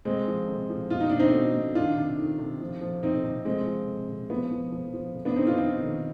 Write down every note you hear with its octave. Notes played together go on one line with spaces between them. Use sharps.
C3 G#3 C4
F3
C3
F3
B2 F4
D#4
B2 D4
C4 D#4
B2
B2
D#3 D4 F4
C3
D#3
C3
F3
F3
C3 C4 D#4
C3
C3 G#3 C4
F3
C3
C3
F3 B3
F3
F3
F3
C3
B3 D4
C3 C4 D#4
D4 F4
C3 C4 D#4
D#3